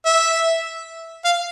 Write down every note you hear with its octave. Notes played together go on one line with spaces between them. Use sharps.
E5
F5